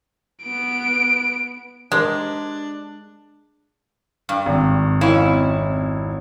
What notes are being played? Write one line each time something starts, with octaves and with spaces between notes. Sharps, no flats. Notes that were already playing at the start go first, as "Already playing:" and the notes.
B3 D7
G#3 D4 G4 A#4 C5
G2
G#1
F2 C#4 E4